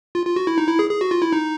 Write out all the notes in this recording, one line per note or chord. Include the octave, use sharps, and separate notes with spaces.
F4
F4
F#4
E4
D#4
E4
G#4
G#4
F#4
F4
E4
D#4